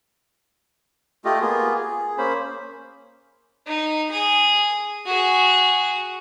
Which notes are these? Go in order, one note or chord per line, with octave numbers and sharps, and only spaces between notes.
A3 F4 G4 D#5
A#3 B3 F4 G#4
G#4
A#3 C#4 C5 B5
D#4
G#4 D#6
F#4 G#4